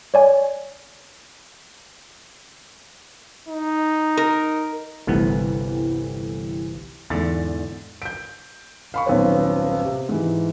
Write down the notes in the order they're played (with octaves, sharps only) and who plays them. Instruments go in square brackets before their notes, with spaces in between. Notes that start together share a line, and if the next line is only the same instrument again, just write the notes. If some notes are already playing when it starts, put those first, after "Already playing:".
[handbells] C#5 D5 G#5
[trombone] D#4
[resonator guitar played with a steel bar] A#4
[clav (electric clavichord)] G1 C2 B3 [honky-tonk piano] D3 E3 G3
[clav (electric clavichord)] E2 D3 [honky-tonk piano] G#2 A6
[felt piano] G6 D7
F5 B5 C#6
D#1 B1 C4 B4 C#5
C3
G#2 E3